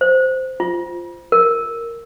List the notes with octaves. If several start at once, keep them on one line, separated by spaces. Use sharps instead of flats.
C5
F4
A#4